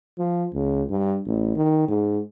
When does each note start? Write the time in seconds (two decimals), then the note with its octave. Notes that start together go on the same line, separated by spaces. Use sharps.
0.18 F3
0.54 C#2
0.90 G2
1.26 A1
1.56 D#3
1.88 G#2